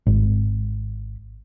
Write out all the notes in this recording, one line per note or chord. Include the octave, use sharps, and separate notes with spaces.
G#1